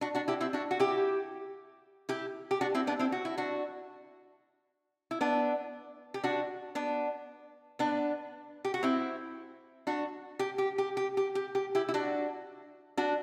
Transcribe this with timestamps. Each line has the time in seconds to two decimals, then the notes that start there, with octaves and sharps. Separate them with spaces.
0.01 D4 F#4
0.15 D4 F#4
0.28 E4 G4
0.41 C4 E4
0.53 D4 F#4
0.71 F#4
0.79 E4 G4
2.09 E4 G4
2.51 G4
2.61 D4 F#4
2.75 C4 E4
2.87 B3 D4
2.99 C4 E4
3.12 F#4
3.25 E4
3.38 D4 F#4
5.11 E4
5.21 B3 D4
6.14 G4
6.24 D4 F#4
6.75 B3 D4
7.79 B3 D4
8.65 G4
8.74 F#4
8.83 C4 E4
9.87 D4 F#4
10.39 G4
10.58 G4
10.78 G4
10.97 G4
11.17 G4
11.35 G4
11.55 G4
11.75 E4 G4
11.89 E4
11.94 D4 F#4
12.97 D4 F#4